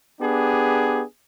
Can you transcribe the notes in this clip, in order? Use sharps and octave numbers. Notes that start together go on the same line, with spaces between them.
B3 D4 G4 G#4